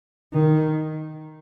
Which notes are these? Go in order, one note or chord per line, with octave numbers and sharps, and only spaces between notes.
D#3